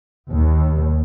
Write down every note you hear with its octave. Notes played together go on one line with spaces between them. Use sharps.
D#2